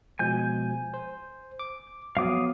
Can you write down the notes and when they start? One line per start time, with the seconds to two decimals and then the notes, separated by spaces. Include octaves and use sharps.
0.19 B2 F3 G#3 G#5 G6
0.94 C5
1.59 D6
2.17 F3 F#3 B3 F5 D6 D#6